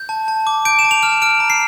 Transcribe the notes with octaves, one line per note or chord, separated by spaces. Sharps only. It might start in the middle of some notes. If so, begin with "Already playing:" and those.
Already playing: G6
A5
A5
D6
G6 D7
E7
A5
F7
F6 F7
F6 D7
A#5
C7